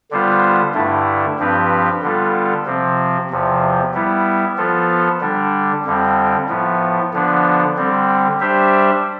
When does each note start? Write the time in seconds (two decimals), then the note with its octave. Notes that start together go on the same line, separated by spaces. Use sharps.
0.11 D3 G3 B3 F4 C5
0.75 G2 D3 A3 E4
1.39 G2 F3 C4 G4 B4
2.02 D3 G3 B3 F4 A4
2.66 C3 F3 C4
3.31 E2 C3 F3
3.94 G3 B3 E4
4.58 F3 B3 F4 A4
5.21 D3 G3 D4
5.85 F2 D3 G3 C4
6.49 A2 F3 B3
7.13 D3 F3 B3 D4
7.77 D3 G3 C4
8.40 G3 D4 G4 C5 E5